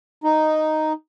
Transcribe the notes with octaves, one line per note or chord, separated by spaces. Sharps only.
D#4